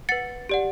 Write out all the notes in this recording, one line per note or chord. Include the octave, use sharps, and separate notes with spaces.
B4 F#5 A6 C#7
G4 D5 F#5